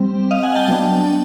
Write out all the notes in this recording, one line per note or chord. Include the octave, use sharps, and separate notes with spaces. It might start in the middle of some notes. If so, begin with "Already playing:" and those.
Already playing: G3 C4
D#5 F5
F#5 G#5
G5 A5
F#3 B3 D4